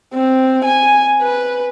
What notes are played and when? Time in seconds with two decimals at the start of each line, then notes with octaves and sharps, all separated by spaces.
0.14 C4
0.64 G#5
1.22 B4